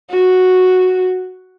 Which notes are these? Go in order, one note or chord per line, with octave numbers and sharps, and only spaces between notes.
F#4